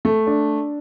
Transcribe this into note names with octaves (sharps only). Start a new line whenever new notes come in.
A3
D4